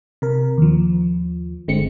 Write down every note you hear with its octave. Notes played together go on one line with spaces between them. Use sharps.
C3 A#4
D#2 F3
G1 D3 G#3 C4 C#7